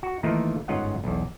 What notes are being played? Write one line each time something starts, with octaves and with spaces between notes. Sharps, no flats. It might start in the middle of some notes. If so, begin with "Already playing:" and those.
F#4
D#3 E3 A3 A#3 D#4 F4
G1 G#2 C#4 F4 D#5 F#5
B1 E2